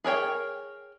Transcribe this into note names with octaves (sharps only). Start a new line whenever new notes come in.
G#4 A#4 C#5 G5